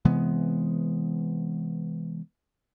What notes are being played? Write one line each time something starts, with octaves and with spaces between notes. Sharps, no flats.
C3 E3 G#3 B3